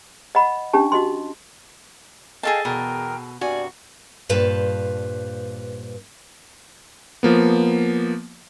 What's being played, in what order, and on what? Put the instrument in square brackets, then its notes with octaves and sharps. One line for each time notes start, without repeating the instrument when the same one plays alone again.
[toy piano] D#5 F#5 B5
C#4 D4 G4 A5
F#4 D#5 C6
[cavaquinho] G#4 A4 A5 [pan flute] D#5 [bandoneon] F5 G5
[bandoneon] E2 A#4 [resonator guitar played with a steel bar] B2 [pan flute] G5
[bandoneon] G2 C3 G3 [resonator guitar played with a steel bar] F#4 [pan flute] D5 [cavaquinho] G#5
[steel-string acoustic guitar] G2 A#2 B4 C5 F5 A5
[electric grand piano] F3 A#3 B3